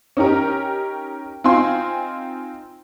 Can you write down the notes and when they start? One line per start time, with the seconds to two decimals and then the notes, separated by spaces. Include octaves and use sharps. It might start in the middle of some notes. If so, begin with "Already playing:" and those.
0.17 C#4 D#4 G4 A#4
1.44 C4 D#4 F4 G#5 C6